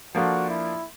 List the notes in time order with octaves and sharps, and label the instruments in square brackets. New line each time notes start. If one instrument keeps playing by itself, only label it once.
[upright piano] F3 A#3 D4 F4 A4 [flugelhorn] F#4
[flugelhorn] E4